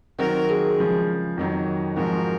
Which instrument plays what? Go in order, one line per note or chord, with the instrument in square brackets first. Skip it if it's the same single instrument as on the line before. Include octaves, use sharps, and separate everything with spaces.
[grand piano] D#3 F#3 C4 F#4 [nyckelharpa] A#4
[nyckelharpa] G#4
[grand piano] C#3 F3 G#3
F2 D#3 F#3
[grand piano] G#2 F3 C4 F#4 [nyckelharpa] A#4